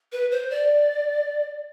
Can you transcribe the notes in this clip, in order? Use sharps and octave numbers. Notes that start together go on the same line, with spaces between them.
B4
C5
D5